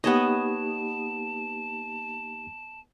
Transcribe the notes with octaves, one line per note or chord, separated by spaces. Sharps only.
A#3 B3 D#4 G4 C#5 D#5 A5